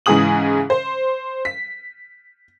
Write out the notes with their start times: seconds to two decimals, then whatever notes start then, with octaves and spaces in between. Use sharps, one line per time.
0.06 G#2 C#3 E3 G#4 D#6 F#7
0.70 C5
1.45 B6